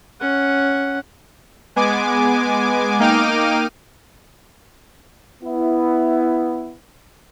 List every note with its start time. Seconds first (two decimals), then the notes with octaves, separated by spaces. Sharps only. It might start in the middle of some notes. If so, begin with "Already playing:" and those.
0.20 C#4 F#5
1.76 G#3 B3 G#5 D6
3.00 A#3 D#4 G5 D6 F6 D#7
5.42 B3 E4